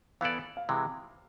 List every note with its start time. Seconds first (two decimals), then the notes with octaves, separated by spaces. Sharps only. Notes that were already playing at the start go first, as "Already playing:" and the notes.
0.21 E3 B3 E4 A4 D5 F5
0.57 F5
0.69 C3 E3 G#3